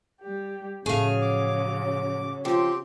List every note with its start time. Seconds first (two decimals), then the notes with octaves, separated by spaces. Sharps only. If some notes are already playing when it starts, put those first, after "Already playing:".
0.21 G3 G4
0.86 A2 C#3 F3 F#3 A3 C#4 G#4 F5
1.22 D6
2.45 F3 C4 G4